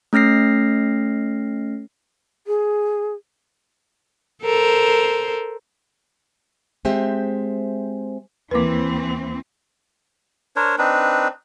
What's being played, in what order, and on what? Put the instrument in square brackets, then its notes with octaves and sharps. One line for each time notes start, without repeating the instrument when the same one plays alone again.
[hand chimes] A3 C#4 F6 A#6 C7
[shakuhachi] G#4
[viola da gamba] A4 A#4 C5
[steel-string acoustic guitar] G#3 C4 G4 C5 E5
[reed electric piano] D#2 A#3 [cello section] E3 C4 [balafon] B4 D6
[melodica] D4 A#4 C5 C#5
C4 D4 D#4 B4